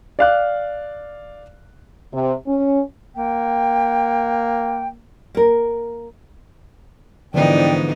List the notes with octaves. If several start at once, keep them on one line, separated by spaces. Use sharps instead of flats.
D5 F5 F#6
C3
C#4
A#3 G5
A#3 A#4
G#2 D3 E3 F3 B3 D#4 D5 G5